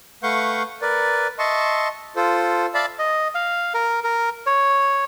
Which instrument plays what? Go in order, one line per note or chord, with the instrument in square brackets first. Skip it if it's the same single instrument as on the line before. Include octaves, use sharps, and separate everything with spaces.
[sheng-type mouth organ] A3 B4 F5 F#5 C#6 G6
A#4 B4 D5
D#5 E5 A5 C6 C#6
F4 A4 C5
D5 E5 F5 A5 B5
[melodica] D#5
F5
A#4
A#4
C#5